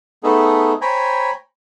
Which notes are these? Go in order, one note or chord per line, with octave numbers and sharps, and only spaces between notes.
A3 B3 D#4 G#4 A4
C5 C#5 G5 G#5 A#5 B5